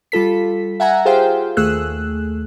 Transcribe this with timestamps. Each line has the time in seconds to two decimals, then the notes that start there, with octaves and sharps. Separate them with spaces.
0.12 G3 F4 A4 B6
0.80 E5 F#5 G#5 A#5
1.05 F4 G4 G#4 C5 F5 G5
1.57 D#2 A3 G#4 E6 F#6